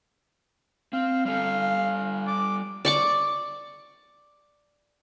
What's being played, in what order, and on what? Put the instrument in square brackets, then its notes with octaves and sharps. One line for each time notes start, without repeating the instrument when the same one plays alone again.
[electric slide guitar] C4 [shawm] F5
[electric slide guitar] G3 A4 [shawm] F5
[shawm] D6
[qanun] D5 C#6 D6